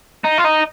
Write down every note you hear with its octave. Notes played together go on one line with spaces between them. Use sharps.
D#4
F4
D#4